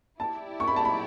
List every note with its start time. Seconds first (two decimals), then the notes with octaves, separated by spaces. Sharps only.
0.20 E4 G4 D5 A5
0.60 C#6
0.68 B5
0.76 A5
0.85 B5